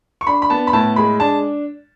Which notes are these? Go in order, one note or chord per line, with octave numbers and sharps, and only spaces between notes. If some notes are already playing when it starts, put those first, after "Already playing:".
C#6
D4 B5
B5
B3 A5
B5
A2 A5
G#3 B5
D4 A5